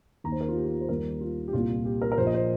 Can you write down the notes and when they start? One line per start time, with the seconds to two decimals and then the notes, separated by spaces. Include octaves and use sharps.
0.24 D#2 D#3 A#3 A#5
0.32 C5
0.41 A#4
0.48 F4
0.56 G4
0.65 F4
0.81 C5
0.89 D#2 D#3 G3 A#4
1.21 F4
1.48 G4
1.53 C2 A#2 A#3 F4
1.85 G4
2.02 A#4
2.12 A#4
2.17 A#1 A#2 A#3 C5
2.26 D#5
2.34 C5